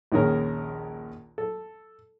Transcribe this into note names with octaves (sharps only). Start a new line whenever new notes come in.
A#1 D#2 D#3 C#4 G#4 A#4
A4